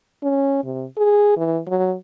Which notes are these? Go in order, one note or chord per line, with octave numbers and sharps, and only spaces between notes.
C#4
C3
G#4
E3
F#3